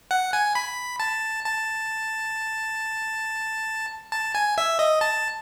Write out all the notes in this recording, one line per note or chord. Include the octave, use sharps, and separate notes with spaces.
F#5
G#5
B5
A5
A5
A5
G#5
E5
D#5
A5